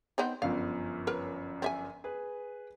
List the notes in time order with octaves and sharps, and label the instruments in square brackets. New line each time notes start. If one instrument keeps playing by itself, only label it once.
[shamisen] B3 C4 D#4
[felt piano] G1 F#2 F3 [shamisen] F5
[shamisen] A#4 B4 C#5
C4 E5 G#5
[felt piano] G#4 B4